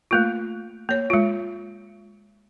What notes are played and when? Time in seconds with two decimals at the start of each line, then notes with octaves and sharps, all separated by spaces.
0.11 A3 A#3 F4
0.89 A#3 C#5
1.10 G#3 F4